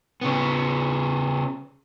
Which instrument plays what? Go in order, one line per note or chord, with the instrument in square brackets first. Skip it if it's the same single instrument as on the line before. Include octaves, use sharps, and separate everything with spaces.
[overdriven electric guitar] C#3 B3